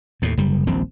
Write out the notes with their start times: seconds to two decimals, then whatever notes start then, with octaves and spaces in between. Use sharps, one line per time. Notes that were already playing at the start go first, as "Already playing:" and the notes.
0.22 D#2 A2
0.37 F#1 G3
0.67 D#1 A#1 C4